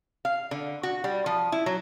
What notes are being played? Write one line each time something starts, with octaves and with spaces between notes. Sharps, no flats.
F5
D3
F#4
G3
F3
E4
F#3